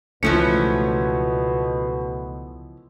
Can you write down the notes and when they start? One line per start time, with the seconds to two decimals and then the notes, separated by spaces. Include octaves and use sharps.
0.23 C#2 B2 E3 F3 A3 C#4 C#7